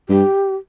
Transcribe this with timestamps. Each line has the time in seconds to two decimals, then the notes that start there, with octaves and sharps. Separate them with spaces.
0.09 G2 G4